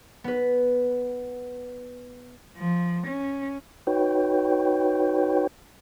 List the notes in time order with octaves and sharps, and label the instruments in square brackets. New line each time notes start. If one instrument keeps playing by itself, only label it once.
[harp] B3 B4
[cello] F3
C#4
[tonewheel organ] D#4 F#4 B4 C#5 G5